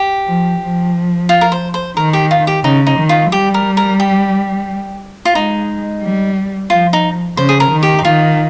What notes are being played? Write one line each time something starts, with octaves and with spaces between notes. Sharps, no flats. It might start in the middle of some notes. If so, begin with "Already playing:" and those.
Already playing: G4
F3
F3
F4
A#4
C5
C5
D#3 A#4
G4
F4
G4
C#3 D#4
D#4
D#3
F4
G3 G4
A#4
A#4
G4
F4
G#3 D#4
G3
F3 F4
D#4
C#3 C5
G#4
A#4
D#3
G4
D#4
D#3 F4